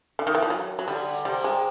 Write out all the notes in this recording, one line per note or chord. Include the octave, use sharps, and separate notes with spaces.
D3
D#3
E3
F3
F#3
F#3
D3 G3
C3 G3
G#3